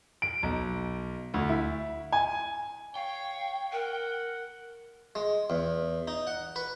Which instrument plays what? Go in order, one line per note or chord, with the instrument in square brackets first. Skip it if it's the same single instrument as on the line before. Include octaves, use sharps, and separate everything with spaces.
[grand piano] D7
B1
D2
E4
G#5
[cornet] C#5 [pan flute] F5 [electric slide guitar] G5
[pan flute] A#4 [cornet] F#5
[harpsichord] G#3
E2
D#4
F#5
B4